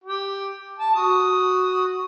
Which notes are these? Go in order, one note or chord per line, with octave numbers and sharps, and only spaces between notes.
G4
A5
F#4 D#6